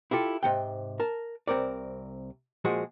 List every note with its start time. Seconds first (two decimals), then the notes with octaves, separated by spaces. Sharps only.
0.11 E4 F4 G4 A4
0.43 G#2 C3 G5
1.00 A#4 A5
1.47 C2 G2 C4 A#4 D5
2.65 A#2 F3 G#3 F#4 G#4